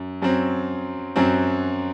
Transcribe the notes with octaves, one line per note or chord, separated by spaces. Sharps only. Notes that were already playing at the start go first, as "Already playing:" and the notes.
Already playing: F#2
F#2 F#3 C4
F#2 F#3 C4